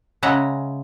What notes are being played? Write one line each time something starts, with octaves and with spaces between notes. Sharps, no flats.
C#3 G#3 E5 F#5 A#5